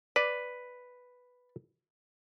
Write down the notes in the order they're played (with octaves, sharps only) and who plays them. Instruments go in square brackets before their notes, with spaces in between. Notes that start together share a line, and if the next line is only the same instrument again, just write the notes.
[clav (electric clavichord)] B4 [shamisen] D5